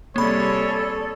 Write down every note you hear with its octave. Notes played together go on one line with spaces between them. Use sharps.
C3 G3 A#3 G#4 A4 C#5 D5 B5